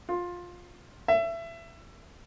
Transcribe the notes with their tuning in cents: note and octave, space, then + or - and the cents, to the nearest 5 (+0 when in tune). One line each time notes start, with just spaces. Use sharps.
F4 +15
E5 +25